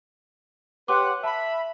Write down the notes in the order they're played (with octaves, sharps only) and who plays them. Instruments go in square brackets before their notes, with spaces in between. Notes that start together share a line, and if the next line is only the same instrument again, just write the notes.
[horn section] G4 B4 F#5 [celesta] C#5 C6 D6
[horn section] E5 B5 [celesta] A5